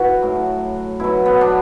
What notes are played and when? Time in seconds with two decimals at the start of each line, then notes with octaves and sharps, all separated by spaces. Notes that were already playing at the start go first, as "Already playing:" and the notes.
Already playing: E3 E4 F#4
0.22 A2 F#3
1.00 B2 F#3 E4
1.26 B3
1.41 D4